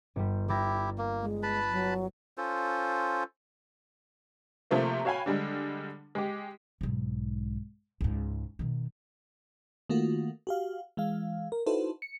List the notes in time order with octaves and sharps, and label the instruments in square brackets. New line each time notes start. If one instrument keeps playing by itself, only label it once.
[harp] G1 G3
[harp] G3 A6 A#6 [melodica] E4 G4
[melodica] A#3
[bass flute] G#3
[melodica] B4 A5 B5
[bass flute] F#3
[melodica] C#4 F4 A4 C5
[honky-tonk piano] C3 F3 A3 A#3
F#4 C#5 F5 G5 G#5 B5
D3 G3 G#3
G#3 G4
[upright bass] B1 G#2
C#2 G#2
B2 D#3
[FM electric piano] D#3 A3 A#3 F4 F#4
F#4 G4 F5
E3 G#3 F5
A#4
D#4 E4 F#4 A4 B4 C5
C#7